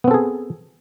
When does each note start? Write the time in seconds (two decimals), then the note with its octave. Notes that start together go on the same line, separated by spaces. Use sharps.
0.04 B3
0.08 C4
0.11 A4
0.14 G#4